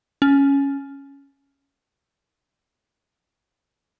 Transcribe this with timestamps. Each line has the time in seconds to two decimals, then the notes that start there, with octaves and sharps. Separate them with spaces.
0.22 C#4